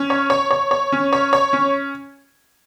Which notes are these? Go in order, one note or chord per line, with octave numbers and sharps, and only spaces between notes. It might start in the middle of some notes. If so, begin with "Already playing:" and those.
Already playing: C#4
C#5
C#5
C#5
C#5
C#4
C#5
C#5
C#4